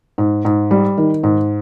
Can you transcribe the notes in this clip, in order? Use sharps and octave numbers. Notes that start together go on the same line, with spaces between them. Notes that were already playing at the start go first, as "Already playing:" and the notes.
G#2
G#2
G3
D#3
G#2